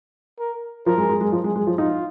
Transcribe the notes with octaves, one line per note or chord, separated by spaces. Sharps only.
A#4
F3 A#4
G#3
G#3
G#3
F3
G#3
G#3
F3
D#4 F4